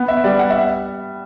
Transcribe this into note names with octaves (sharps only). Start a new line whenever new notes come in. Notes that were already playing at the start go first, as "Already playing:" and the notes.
Already playing: B3
E5
G3 D5
F#5
E5